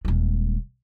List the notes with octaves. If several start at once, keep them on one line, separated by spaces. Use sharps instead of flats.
D#1 G#3